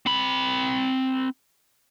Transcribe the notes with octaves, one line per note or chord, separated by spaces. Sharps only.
C4 B5